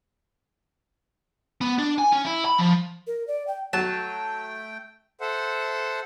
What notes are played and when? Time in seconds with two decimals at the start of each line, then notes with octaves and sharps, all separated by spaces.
1.61 B3
1.79 D4
1.99 G#5
2.13 C#4
2.25 E4
2.46 B5
2.59 F3
3.07 A#4
3.27 D5
3.47 G5
3.73 F#3 A3 G5 A5
5.21 A4 C5 E5 F#5